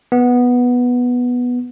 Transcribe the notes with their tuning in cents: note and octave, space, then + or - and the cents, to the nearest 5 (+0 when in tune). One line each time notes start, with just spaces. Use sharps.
B3 -5